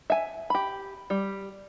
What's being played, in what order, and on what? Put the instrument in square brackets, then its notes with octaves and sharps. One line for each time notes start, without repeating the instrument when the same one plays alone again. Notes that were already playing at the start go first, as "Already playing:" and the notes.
[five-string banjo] E5 G#5
G4 B5
G3